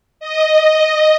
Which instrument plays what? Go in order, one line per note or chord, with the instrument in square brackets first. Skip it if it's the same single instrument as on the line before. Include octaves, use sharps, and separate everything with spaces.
[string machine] D#5